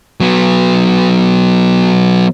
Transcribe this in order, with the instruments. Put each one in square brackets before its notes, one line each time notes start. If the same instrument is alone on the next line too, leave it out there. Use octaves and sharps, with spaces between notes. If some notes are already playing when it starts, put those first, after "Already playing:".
[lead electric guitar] F#3 B3